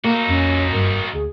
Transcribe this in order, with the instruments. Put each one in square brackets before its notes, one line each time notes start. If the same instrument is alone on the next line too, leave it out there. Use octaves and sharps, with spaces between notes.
[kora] A#3 [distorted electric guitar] D#4 F#4
[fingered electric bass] B1 F2 [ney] C#4
[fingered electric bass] F#1 G2 G3 [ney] A#4
[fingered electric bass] D2 [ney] G#4